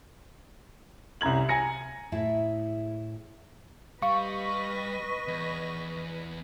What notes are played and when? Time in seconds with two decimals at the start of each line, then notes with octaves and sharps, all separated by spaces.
1.21 C2 C#4 A#5 G#6 F#7
1.49 G#5 A#5 A#6 C#7
2.12 A2 E4 G#4 E5 A5
4.02 G3 B4 D#5 F5 C#6
5.28 E2